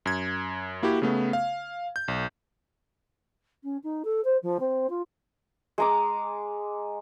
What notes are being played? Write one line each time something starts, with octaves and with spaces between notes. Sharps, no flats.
F#2 G#6
A#3 E4 F#4 G4
C#3 A3 B3
F5
G6
B1
C#4
D#4
A4
C5
F3
C4
F4
G#3 A#5 D6